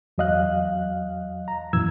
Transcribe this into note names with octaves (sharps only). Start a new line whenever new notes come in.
E2 F#3 D#5 F5 F#6
A#5
F#2 A#2 E3 E6 G#6